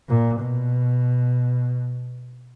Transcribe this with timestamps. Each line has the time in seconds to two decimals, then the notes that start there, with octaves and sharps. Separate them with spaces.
0.08 A#2
0.40 B2